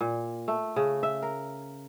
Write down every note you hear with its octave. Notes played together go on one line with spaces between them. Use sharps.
A#2
A3
C#3
E5
A#4